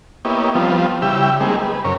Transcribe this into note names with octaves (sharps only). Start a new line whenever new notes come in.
A#3 B3 E4 G4 C#5 D#5
F3 G3 B3 C4 F4
C#3 G3 E4 G4 G5 E6
G3 G#3 A#3 C4 D#4 G#4
B4
F#2 C#3 A#4 C#5